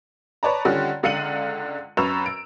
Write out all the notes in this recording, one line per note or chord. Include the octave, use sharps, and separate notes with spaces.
B4 C#5 D5 A5 A#5
D3 D#3 G3 C#4 F4
C#2 D3 F5 C#7 D#7 F#7
F#2 B4 C#6 E6 E7 F7
D7